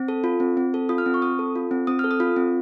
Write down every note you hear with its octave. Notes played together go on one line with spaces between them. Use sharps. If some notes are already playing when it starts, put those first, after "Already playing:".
Already playing: C4
A4
F4
C4
C4
A4
F4 D#6
F6
C4
C#6
C4 D#6
A4
F4
C4
C4 D#6
A4 F6
D#6
F4
C4